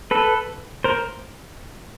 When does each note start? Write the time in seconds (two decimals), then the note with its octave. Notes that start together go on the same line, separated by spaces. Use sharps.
0.11 A4 B4
0.84 A#4 C5